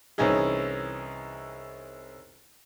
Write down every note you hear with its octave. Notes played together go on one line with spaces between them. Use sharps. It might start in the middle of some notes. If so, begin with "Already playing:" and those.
C2 E3 C#4 D#4 G#4